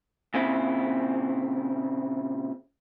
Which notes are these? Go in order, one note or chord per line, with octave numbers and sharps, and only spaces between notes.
A#2 C#3 C4 E4